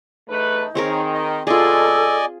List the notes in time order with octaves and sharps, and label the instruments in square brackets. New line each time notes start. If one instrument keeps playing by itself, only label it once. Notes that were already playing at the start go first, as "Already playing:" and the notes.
[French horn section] E2 A3 B4 [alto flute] D#4
[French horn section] D#3 [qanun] C4 G#4 A#4 [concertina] C#5
[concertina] D#5
[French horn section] D2 B2 [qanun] F4 G#4 [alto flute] A4 [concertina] D5 D#5 G#5